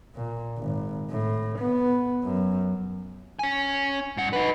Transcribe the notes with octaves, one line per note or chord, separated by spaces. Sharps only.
A#2
G#1
A2
B3
F#2
C#4 G#5
G2 F#5
D#4 B4